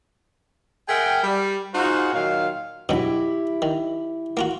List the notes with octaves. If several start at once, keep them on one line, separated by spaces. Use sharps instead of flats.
G#4 A#4 E5 F#5 G5
G3
D#4 F4 F#4 G#4 C5 F#5
A#2 D#3 F#3 F5
B2 F#3 E4 G4
D#3
A#3 F4 F#4